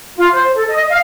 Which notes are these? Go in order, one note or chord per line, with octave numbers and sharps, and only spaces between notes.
F4
C5
A4
D#5
F5